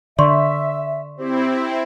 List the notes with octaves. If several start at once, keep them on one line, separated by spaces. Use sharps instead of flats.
D3 D5 E5 C6 C#6
C4 E4 G4 C5